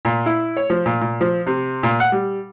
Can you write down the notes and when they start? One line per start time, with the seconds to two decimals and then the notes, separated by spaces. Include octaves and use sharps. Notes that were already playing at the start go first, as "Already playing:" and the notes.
0.05 A#2
0.26 E4
0.57 C#5
0.70 F3
0.86 A#2
1.01 A#2
1.21 F3
1.46 C3
1.83 A#2
2.00 F#5
2.12 G3